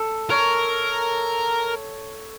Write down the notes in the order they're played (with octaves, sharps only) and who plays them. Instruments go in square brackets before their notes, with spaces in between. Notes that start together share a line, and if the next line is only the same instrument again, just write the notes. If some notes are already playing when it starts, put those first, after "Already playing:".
Already playing: [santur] A4
[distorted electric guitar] A#4 [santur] C#5